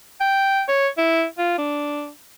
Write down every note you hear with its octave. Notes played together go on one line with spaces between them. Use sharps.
G5
C#5
E4
F4
D4